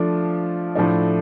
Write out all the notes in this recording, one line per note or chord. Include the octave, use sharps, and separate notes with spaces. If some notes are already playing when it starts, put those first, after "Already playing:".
Already playing: F3 A3 D4 F4
A2 F3 A3 D4